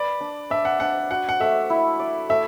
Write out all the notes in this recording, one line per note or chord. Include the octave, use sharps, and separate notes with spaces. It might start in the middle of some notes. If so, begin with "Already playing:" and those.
Already playing: B4 D5
D4
D4 E5
F#5
D4 F#5
F#4 F#5
F#5
A3 E5
E4
D5
A3 E5